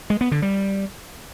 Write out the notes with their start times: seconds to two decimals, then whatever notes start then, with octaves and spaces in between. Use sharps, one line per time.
0.10 G#3
0.21 B3
0.32 D3
0.42 G3